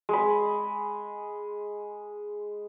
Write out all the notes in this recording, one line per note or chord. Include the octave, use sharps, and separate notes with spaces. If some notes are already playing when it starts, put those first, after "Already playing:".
G#3 B5